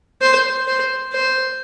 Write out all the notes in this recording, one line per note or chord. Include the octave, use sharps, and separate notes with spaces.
C5
C5
C5